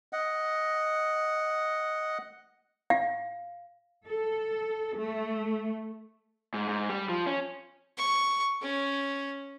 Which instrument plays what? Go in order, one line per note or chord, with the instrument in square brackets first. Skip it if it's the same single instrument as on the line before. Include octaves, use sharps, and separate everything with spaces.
[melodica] D#5 F#5
[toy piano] F5
[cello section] A4
A3
[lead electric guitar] G#2
G#2
G3
F3
C#4
[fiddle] C#6
C#4